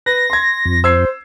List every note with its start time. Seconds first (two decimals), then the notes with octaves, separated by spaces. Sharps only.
0.06 B4 A#6
0.30 C6 G#6
0.65 F2
0.84 C5 E6 G#6 C7